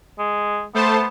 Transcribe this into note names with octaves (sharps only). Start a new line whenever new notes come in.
G#3
A3 B3 C5 A5